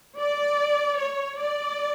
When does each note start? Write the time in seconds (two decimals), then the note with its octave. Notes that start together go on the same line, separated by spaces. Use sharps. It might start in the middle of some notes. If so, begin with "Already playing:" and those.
0.20 D5
0.98 C#5
1.39 D5